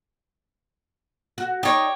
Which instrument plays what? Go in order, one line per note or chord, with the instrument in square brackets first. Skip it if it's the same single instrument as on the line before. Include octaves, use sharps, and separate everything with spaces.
[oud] F#4
[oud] D#4 D5 [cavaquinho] G4 C#5